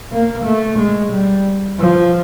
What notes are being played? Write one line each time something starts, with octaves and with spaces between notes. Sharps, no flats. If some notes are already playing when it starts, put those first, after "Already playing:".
A#3
A3
G#3
G3
F3